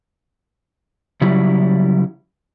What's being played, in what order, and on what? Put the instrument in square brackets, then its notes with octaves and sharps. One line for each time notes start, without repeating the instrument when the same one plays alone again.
[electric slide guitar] C#3 F#3 G3 E4